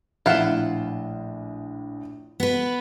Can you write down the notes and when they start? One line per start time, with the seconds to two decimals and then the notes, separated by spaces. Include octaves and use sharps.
0.26 A#1 A2 E4 F4 F#5 E7
2.40 B3 B4